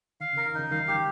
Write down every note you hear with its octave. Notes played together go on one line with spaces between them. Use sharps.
D#3 F5
C#3 A#4
D#3
C#3 F3 D#4
D#3 G3 F5
G4